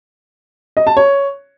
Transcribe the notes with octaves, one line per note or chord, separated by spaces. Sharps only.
D#5
A5
C#5